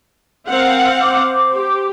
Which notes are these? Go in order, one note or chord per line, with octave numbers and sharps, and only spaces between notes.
C4 A#4 F5 F#5
C5 D6
G4